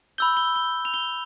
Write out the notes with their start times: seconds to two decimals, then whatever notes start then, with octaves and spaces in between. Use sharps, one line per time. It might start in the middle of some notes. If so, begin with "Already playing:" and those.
0.18 B5 E6 G6 G7
0.37 G7
0.56 G7
0.85 F7
0.94 G7